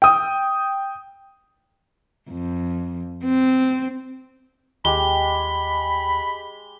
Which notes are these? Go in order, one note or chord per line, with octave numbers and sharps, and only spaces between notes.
G5 D#6
F2
C4
D#2 G#3 G4 B5 G7